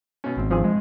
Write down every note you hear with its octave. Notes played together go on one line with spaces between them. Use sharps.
B2 C#4
G#1 C4
G2 C3 F3 G#4
G#3